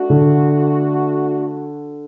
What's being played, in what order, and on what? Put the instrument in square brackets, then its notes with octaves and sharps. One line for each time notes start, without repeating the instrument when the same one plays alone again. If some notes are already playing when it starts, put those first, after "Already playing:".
Already playing: [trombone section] A3 D4 F#4
[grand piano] D3